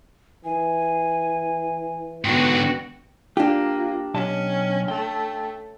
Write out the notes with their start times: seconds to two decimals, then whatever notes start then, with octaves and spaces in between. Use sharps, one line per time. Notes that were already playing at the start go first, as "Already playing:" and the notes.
0.45 E3 G#5
2.25 G#2 D3 B3 F#4 G5
3.37 A#3 D4 F4 G4
4.14 B1 C#4 D#5 A5
4.88 A3 G5